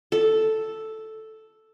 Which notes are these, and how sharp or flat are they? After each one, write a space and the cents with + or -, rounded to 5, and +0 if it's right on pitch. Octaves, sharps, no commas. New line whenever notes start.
A4 +0